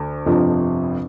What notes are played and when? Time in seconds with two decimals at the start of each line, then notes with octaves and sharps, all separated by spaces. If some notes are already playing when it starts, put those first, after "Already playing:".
Already playing: D2
0.26 G1 F2 C3 F3